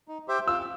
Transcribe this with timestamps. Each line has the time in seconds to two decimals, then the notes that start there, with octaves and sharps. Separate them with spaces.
0.08 D#4
0.28 G4 C5 E5 G5
0.47 F4 E6